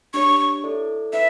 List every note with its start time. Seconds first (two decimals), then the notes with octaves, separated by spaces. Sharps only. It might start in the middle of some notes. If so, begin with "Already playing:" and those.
0.13 D4 G4 C#5 C#6
0.64 E4 A4 D5
1.13 E4 B4 E5